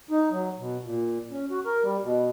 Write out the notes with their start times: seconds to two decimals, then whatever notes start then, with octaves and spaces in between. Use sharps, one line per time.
0.11 D#4
0.31 F#3
0.58 B2
0.83 A#2
1.31 C#4
1.50 F#4
1.65 A#4
1.83 G3
2.03 B2